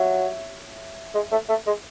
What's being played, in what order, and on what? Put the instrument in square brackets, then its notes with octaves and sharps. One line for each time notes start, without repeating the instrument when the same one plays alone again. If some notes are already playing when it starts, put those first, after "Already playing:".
Already playing: [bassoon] F#3 [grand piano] C#5 E5
[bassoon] G#3
A3
A3
G#3